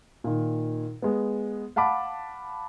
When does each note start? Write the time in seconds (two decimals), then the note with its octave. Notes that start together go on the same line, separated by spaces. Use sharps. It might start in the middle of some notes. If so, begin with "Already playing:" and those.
0.24 A#2 D#3
1.02 G#3 B3
1.76 F5 F#5 A5 B5 D6